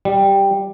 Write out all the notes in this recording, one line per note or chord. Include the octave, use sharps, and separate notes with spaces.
G3